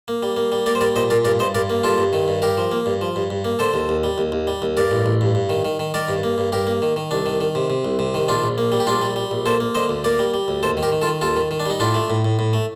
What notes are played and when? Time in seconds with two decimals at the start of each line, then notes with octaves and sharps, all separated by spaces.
0.08 A#3
0.23 G3
0.37 A#3
0.52 G3
0.66 A#3 A#4 D5
0.75 C5
0.81 G3 A#4 D5
0.96 A#2 C5 D#5
1.10 A#2 A#4 D5
1.25 G2 A#4 D5
1.39 G2 C5 D#5
1.55 G2 A#4 D5
1.70 A#3
1.83 G2 F4 A4
1.98 G2
2.13 D#3
2.28 G2
2.42 G2 G4 A#4
2.57 F3
2.72 A#3
2.86 G2
3.01 F3
3.16 G2
3.30 G2
3.45 A#3
3.59 D3 A4 C5
3.74 D#2
3.89 D#2
4.04 G3
4.18 D#2
4.32 D#2
4.47 G3
4.62 D#2
4.77 G2 A#4 D5
4.91 A1
5.06 A1
5.21 G2
5.35 G2
5.49 D#3
5.65 D#3
5.79 D#3
5.94 D#3 A#4 D5
6.09 G2
6.23 A#3
6.38 G2
6.52 G2 G4 A#4
6.67 A#3
6.82 D#3
6.96 D#3
7.11 C2 D4
7.26 D#3
7.40 D#3
7.55 C3
7.70 C3
7.85 C2
7.99 C3
8.14 D#3
8.28 A#1 D4 F4
8.44 A#1
8.58 A#3
8.72 G3
8.80 G4
8.87 A#1 D4 F4
9.02 G3
9.16 G3
9.31 A#1
9.46 A#3 A4 C5
9.60 A#3
9.75 D3 C5 D#5
9.89 D2
10.04 A#3 A#4 D5
10.19 G3
10.34 G3
10.48 D2
10.63 D#2 A4 C5
10.77 D#3
10.83 G4 A#4
10.92 D#3
11.02 F4 A4
11.07 D#3
11.21 D#2 F4 A4
11.36 D#3
11.51 D#3
11.60 D4
11.66 G3 D#4
11.80 A2 D4 F4
11.94 A3
12.10 A2
12.25 A2
12.39 A2
12.53 A3